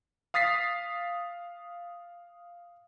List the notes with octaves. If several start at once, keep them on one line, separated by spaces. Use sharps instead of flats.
F5 D#6 A6 B6 C7